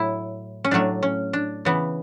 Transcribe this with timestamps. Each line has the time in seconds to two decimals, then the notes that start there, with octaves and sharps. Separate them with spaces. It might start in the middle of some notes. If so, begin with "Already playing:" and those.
Already playing: A2 F#3 E4
0.64 C#4
0.71 A2 F#3 A3 D4
1.03 C#4
1.33 D4
1.65 C#3 E3 B3